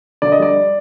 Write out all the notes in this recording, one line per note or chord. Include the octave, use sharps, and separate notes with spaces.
D3 D5
D#5
G3 D5